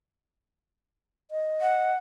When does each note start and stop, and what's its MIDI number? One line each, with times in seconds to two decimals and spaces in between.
1.31 1.92 75
1.61 1.96 78